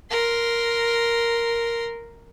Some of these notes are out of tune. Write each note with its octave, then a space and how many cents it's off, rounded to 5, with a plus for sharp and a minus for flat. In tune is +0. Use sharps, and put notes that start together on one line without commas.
A#4 +0 C6 -5